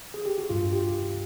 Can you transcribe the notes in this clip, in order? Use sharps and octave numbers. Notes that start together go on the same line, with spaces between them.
G#4
G4
F#4
G2 F4
G4